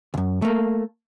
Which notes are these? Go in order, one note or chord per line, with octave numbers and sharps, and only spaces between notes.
C#2 F#2
A3 A#3